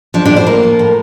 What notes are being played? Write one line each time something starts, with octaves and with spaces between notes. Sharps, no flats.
F3 D4
D4
A2
C5
A#3 A#4
F3
A2